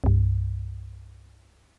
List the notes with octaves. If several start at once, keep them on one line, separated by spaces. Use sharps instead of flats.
C2 G2